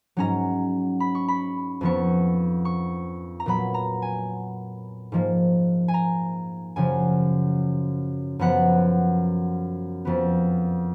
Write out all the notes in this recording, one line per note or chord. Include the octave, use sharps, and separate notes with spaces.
G#2 F#3 C#4 A#5
B5
C#6
B5
F2 F3 B3 C#6
C#6
A#5
A#2 F#3 B3 B5
A#5
G#5
G#2 F3 A#3
G#5
A#5
F#2 C#3 F3 G#5
F#2 F3 B3 F#5
F2 F3 B3